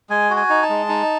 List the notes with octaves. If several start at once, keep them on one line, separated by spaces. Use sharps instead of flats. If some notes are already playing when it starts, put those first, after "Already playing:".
G#3 G#5
F#4
G#5
D#4
A5
G#3
D#4